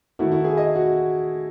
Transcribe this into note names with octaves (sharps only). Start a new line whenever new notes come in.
D#3 A3 E4 F#4
E4
G#4
D#5
F#4